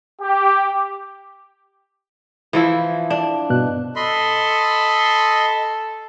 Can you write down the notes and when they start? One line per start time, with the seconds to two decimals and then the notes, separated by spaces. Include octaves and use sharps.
0.22 G4
2.53 E3 F3 E4
3.10 D4
3.50 G2 B2 F#6
3.96 A4 D#5 B5 C6